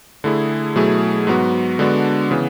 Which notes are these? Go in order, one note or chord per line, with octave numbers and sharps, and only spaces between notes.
D3 A3 E4 G#4
B2 F#3 A3 E4 G#4
G#2 F#3 B3 F#4
D3 G#3 B3 D4 F#4
C#3 E3 B3